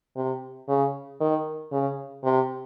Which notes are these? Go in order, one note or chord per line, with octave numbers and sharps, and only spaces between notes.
C3
C#3
D#3
C#3
C3